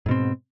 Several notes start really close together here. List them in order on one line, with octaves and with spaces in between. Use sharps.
G#2 B2 C4